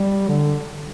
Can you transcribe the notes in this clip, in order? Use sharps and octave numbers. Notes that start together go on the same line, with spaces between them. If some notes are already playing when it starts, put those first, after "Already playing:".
Already playing: G3
D3